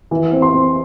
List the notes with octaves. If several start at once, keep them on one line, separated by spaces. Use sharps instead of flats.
E3
C4
C6
C4